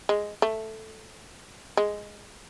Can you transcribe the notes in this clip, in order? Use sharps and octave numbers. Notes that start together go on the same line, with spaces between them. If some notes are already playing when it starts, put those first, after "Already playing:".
G#3
A3
G#3